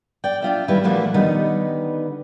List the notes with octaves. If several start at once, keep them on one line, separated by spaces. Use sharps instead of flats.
D5 G5
D4 F4 E5
D#3 G3 E4 G4 B4
A#2 E3 F3 A3 A#3 F#4
D3 D#3 G3 B3 D#4